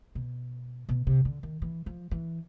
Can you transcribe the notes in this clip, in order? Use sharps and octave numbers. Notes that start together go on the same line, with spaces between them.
B2
B2
C3
D3
D#3
E3
F3
E3